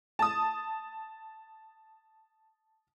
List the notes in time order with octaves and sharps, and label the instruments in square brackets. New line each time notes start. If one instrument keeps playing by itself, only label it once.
[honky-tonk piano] A5 D#6